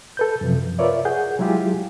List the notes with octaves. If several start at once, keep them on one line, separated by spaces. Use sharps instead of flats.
A4 B4 G6
F#2 C3 F3
F4 A#4 B4 C#5 D5 E5
G#4 F#5 G6
F#3 G#3 E4 F4 G4 G#4